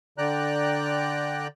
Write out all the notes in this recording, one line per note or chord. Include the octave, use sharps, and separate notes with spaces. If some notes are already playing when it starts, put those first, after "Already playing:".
D3 D5 G5 A#5 F#6